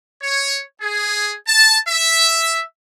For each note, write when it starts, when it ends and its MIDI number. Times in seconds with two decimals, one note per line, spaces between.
0.23 0.62 73
0.81 1.35 68
1.47 1.78 81
1.88 2.62 76